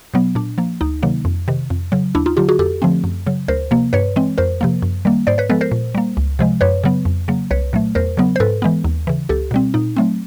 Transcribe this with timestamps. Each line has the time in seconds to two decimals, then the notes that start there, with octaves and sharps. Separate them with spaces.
0.14 B2 F#3 B3
0.35 A#2 D4
0.58 F3 A#3
0.81 D2 D#4
1.03 C3 D#3 F#3 A#3
1.25 F2
1.48 C3 D#3
1.70 F2
1.92 C#3 F#3
2.15 D#2 D4 E4
2.26 D#4 F4
2.37 D3 F#3 F4 G4
2.49 F#4 G#4
2.59 F2 G4 A4
2.82 D3 F3 A3 C4
3.04 F#2
3.27 C#3 F#3
3.48 D2 A#4 C5
3.71 C3 F3 A#3
3.93 G2 B4 C#5
4.16 E3 G#3 C4
4.38 F2 A#4 C5
4.61 C3 F3 A#3
4.82 F#2
5.05 D#3 G3 A#3
5.27 G#2 C5 D5
5.38 B4 C#5
5.50 F3 G#3 B3 A4 B4
5.61 A#4 C5
5.72 A#2
5.95 G3 A#3
6.17 C#2
6.39 C3 F3 G#3
6.61 F#2 B4 C#5
6.84 C#3 F#3 B3
7.05 F2
7.28 C#3 F#3 A#3
7.51 C2 B4 C#5
7.73 A#2 F#3 A3
7.95 E2 A#4 C5
8.17 C#3 F#3 B3
8.36 C5
8.40 G#2 A4 B4
8.62 E3 G#3 B3
8.84 D#2
9.07 C#3 E3
9.29 C#2 G4 A4
9.51 B2 G3 C4
9.74 A#2 D#4
9.97 F#3 A3 C4